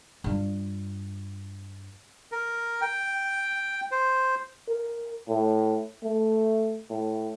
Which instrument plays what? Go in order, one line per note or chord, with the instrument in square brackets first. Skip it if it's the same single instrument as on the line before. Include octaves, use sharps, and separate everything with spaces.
[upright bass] G2 F4
[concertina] A#4
G5
C5
[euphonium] A#4
A2
A3
A2